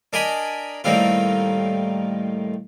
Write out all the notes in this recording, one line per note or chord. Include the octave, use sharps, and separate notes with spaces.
D4 A#4 D5 D#5 G#5 B5
A2 D#3 G3 A#3 C4 F4